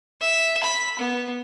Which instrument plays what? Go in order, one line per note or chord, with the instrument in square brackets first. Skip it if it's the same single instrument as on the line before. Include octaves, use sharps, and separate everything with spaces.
[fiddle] E5
B5
B3